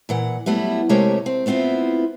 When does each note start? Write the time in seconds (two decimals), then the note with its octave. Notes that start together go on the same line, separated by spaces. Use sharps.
0.09 A#2 E3 F#5
0.46 F#3 G3 A3 B3 E4
0.89 C3 G#3 A3 G4 A#4 C#5
1.26 C4
1.46 A3 B3 C4 E4 F4